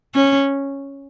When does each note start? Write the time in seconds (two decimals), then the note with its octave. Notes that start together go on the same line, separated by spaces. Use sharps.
0.15 C#4